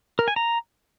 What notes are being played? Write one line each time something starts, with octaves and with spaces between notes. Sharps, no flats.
A#4
G#5
A#5